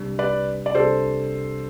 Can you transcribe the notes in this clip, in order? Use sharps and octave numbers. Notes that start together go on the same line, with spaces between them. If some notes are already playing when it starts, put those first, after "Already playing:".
Already playing: C2 C3 G3 D4
B4 D5
D5
C2 C3 G3 D4 A4 C5